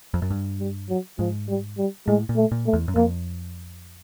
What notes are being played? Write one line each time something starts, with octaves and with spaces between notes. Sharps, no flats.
F2
F#2
G2
G3
F#3
G#2 F3
G3
G3
A2 G#3
A#2
A3
A#2
A3
E2
F#2
F2 A#3